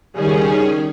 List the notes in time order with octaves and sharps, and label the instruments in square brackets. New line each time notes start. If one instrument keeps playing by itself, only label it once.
[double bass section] C#2 D#3 G3 [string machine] C#4 G#4